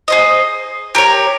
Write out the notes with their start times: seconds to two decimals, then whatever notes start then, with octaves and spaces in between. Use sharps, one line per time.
0.08 G#4 C5 D#5
0.95 G4 A#4 C#5